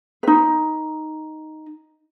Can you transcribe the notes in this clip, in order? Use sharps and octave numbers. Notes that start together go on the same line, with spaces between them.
D#4 B4